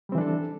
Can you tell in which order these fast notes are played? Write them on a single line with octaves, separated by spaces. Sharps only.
G3 C4 E3 D4 A4